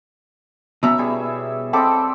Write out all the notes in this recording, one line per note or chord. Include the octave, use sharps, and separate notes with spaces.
B2 B3 C#4 E5 A#5
G3 E4 G#4
C4 A4 D#5 A5 B5 D6